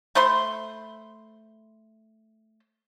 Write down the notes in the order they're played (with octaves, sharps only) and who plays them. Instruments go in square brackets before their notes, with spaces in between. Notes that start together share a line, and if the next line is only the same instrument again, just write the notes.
[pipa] A3 C5 B5 C6